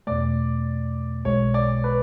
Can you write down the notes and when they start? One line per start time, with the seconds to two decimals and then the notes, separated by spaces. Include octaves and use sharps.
0.07 E2 B2 A3 D5
1.25 B1 B2 G#3 C#5
1.54 D5
1.84 B4